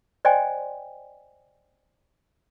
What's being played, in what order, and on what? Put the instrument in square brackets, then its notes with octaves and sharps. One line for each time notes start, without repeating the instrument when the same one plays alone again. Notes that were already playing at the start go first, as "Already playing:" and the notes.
[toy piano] C5 D5 D#5 G5 G#5 C6